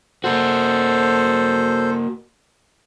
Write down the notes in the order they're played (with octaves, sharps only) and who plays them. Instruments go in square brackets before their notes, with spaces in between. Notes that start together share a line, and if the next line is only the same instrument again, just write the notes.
[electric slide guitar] A#3 F#4 [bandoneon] A4 C5